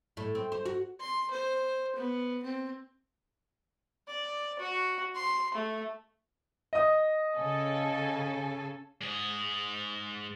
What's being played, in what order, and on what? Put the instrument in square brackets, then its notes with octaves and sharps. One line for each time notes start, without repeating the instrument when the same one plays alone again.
[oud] A2
C4
C5
F#4
[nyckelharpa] C6
C5
B3
C4
[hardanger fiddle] D5
F#4
C6
A3
[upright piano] D#5 D#6
[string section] C#3 A4 G#5
[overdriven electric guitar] G#2 G#4